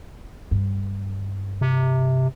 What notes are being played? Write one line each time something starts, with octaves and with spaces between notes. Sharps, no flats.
G2
C3